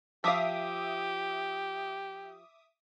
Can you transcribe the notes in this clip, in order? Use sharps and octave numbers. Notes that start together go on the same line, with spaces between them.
F3 G4 E5 F5 D6 D#6